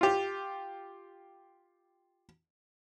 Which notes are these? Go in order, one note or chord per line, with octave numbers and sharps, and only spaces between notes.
F4 G4